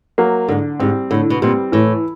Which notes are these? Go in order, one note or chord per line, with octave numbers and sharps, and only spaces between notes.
F#3 A#3
G#2 D3
G#2 G3 C4
A2 D3
B2
A#2 G3 C4
A2 E3